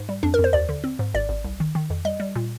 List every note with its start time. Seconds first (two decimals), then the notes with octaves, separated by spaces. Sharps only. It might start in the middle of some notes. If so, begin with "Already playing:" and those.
Already playing: G#2
0.09 G3
0.23 F2 D4
0.34 A#4
0.39 F2
0.44 C5
0.53 D#2 D5
0.69 D3
0.84 C4
0.99 G#2
1.14 G#1 D5
1.29 G#1
1.44 C2
1.60 D#3
1.75 D#3
1.90 F2
2.05 G3 D#5
2.20 G3
2.36 A#2